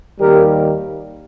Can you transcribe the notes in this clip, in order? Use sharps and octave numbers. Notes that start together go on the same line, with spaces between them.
D#2 D#3 G3 A#3 G4 A#4